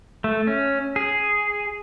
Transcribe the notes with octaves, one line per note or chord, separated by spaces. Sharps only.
A3
C#4
G#4